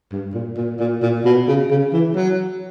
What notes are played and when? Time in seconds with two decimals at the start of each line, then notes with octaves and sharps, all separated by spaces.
0.12 G2
0.34 A#2
0.57 A#2
0.80 A#2
1.02 A#2
1.25 B2
1.48 C#3
1.70 C#3
1.93 E3
2.15 F#3